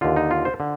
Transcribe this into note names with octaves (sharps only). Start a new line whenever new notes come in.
D#2 D3 F4
D#4
F4
C5
D3